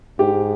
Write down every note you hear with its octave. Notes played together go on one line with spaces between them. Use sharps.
G#2 G4